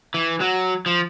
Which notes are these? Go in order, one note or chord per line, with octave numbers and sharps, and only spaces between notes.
E3
F#3
F3